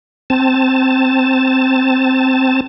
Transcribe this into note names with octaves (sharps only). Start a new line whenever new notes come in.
C4 A5